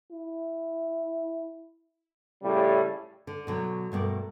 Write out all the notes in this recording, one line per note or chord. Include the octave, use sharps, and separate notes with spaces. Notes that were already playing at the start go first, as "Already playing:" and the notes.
E4
A2 C#3 G3
D3
B2 D3 F#3
G2 B2 A3 A#4 D5